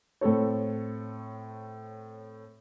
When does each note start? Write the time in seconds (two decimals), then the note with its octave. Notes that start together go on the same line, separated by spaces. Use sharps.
0.21 A2 C4 A4 C#5